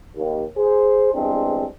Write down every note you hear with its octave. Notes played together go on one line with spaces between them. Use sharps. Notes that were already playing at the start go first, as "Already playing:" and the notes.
D#2
G#4 C5
E2 G2 G#3 C4 D4